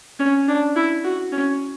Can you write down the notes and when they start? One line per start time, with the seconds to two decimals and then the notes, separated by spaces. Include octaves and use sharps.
0.20 C#4
0.48 D4
0.76 E4
1.04 F#4
1.32 C#4